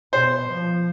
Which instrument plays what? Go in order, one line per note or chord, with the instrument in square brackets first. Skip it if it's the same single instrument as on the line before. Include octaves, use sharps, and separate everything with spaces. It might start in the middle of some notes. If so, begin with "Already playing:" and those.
[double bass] B2 [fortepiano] C5
[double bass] F3